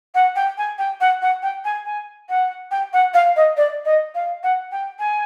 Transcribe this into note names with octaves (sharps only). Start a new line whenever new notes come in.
F#5
G5
G#5
G5
F#5
F#5
G5
G#5
G#5
F#5
G5
F#5
F5
D#5
D5
D#5
F5
F#5
G5
G#5